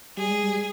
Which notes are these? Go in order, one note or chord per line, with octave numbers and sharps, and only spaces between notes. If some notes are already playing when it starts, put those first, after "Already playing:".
G3 G#4
G#3
G3